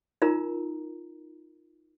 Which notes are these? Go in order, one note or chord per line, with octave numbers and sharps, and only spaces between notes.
D#4 F4 A#4 A#5